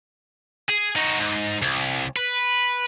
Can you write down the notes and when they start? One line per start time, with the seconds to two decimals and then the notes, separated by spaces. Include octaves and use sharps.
0.69 G#4
0.96 D#4 F#4
1.20 G#2
1.62 C2
2.16 B4